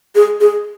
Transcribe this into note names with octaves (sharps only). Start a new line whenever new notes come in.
G#4
G#4